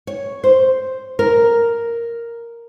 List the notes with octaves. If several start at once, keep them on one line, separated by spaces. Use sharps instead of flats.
C#5
C5
A#4